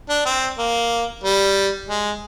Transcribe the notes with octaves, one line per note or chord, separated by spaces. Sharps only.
D4
C4
A#3
G3
G#3